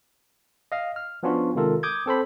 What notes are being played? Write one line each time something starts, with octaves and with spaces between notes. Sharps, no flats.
D#5 F5
F6
F3 B3 C#4 D4 F4 F#4
C3 D#3 G#3 F4 A4 A#4
D6 D#6 G6 G#6
C4 A4 C5 B5